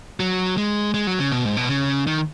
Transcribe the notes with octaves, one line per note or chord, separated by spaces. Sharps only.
F#3
G#3
G#3
F#3
C#3
B2
G#2
B2
C#3
D#3